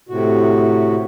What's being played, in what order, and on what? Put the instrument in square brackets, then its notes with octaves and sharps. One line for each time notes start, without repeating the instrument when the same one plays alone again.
[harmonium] A2 C3 F#4